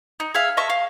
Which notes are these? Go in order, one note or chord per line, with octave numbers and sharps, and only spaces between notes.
D#4
G#4 E5 F5
D#5 E5 A5 C#6
F5